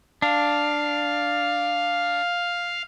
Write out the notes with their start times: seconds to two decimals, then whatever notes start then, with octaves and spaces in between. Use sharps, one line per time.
0.22 D4 F5